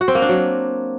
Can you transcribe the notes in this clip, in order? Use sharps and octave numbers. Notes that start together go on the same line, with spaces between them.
F#4
C4
A#3
D4
F#3